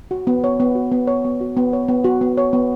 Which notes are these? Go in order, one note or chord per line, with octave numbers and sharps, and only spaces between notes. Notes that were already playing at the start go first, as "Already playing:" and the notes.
F#4
B3
C#5
B3
F#4
B3
C#5
B3
F#4
B3
C#5
B3
F#4
B3
C#5
B3